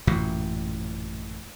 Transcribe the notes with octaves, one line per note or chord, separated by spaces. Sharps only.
A1 F#2 A#2